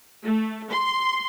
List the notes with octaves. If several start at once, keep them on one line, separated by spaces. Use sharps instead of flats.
A3
C6